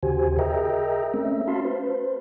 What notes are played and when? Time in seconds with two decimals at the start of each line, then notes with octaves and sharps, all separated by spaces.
0.03 D#2 C#3 F#4 G4 C5 G#5
0.39 G#4 A#4 D#5 E5 G5 A#5
1.14 A3 C4 C#4 E5
1.48 C#4 F#4 F5 A5 B5 C6
1.65 B4 C5